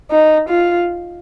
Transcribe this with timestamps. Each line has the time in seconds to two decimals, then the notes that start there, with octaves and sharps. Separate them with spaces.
0.11 D#4
0.49 F4